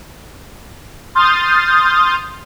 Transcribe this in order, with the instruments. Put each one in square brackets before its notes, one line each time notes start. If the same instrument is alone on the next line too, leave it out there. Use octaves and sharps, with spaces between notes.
[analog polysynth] C6 D#6 F6 G6 A6